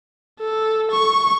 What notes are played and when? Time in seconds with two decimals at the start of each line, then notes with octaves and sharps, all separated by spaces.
0.40 A4
0.91 C#6